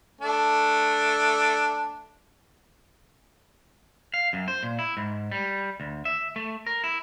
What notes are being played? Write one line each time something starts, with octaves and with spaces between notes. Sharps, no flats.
A3 D4
F5
F#2
C5
A#2
E4
G#2
G3
D2
E5
A3
A#4
E4